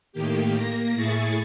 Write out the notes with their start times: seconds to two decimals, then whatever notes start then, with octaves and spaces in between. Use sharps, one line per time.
0.13 A2 D#3 A#3 G4
0.56 A#3 A#6
0.95 A2 E4 G#4 C#6 A6